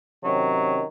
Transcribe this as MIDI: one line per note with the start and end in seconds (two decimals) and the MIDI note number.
0.24 0.83 48
0.24 0.83 51
0.24 0.85 54
0.24 0.83 61